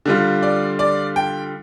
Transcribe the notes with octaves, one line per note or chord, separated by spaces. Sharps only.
D3 G3 F4
D5
D5
G5